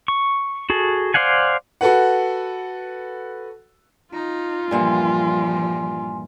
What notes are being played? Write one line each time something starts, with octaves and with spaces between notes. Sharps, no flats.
C#6
F#4 G#4 A4
C5 D5 F5 F#5 G#5
F#4 A4 B4 F#5
D#4 F4
G2 A#2 E3 F3 G3 G#5 C6